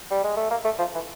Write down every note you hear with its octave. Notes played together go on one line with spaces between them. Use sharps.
G3
G#3
A3
A#3
A3
F3
E3